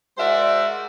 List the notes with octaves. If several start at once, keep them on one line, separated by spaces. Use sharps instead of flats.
G#3 F#4 A#4 C5 D5 E5